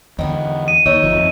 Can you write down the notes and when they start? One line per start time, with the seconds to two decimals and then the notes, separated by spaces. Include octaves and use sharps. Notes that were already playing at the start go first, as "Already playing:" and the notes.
0.19 E2 D3 D#3 B3
0.68 D#7
0.86 D#2 D#4 C#5 E5
1.03 G1 F3
1.15 F2